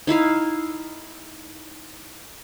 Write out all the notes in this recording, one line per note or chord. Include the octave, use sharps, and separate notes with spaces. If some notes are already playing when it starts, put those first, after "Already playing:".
D#4 E4 E5 F5